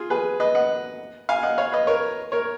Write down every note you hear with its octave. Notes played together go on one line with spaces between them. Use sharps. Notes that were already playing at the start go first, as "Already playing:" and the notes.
Already playing: F4 G#4
G#4 B4
B4 D#5
D#5 F#5
F5 G#5
D#5 F#5
C#5 F5
B4 D#5
A#4 C#5
A#4 C#5